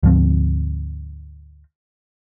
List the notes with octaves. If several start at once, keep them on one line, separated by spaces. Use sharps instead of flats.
D2 G#2 F3 C4